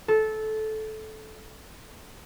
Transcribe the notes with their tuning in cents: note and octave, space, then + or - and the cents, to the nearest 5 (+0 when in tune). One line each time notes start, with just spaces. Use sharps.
A4 -15